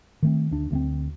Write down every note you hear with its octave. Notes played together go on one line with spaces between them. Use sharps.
D#3 A3 C4
D2 D4
D2 A3 C4